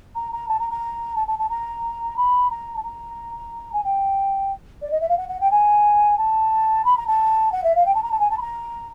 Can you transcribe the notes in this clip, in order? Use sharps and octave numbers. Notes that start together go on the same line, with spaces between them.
A#5
A#5
A5
A#5
A#5
A5
A5
A5
A#5
B5
A#5
A5
A#5
G#5
G5
D5
D#5
E5
F5
F#5
F#5
G5
G#5
A5
B5
A#5
A5
F#5
E5
F5
G5
A5
A#5
A5
G#5
A5
B5
A#5